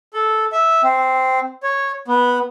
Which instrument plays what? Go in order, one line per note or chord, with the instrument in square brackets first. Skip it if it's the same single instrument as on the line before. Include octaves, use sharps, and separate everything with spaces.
[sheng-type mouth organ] A4
E5
C4
C#5
B3